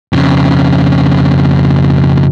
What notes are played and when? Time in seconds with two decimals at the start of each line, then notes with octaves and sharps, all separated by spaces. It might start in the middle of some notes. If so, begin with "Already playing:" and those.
0.13 F2 C#3